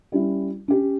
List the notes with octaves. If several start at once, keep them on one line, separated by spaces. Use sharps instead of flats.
G3 C#4 E4
C#4 G4